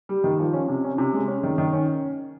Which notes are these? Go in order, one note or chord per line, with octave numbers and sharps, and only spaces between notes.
G3
D#3
F3
C#4
C3
C#4
C3
G#3
C#4
D#3
D#3
C#4